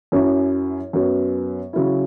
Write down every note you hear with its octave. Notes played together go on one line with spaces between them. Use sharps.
F#2 F#3 C#4 E4
F#2 F#3 B3
C#3 F#3 E4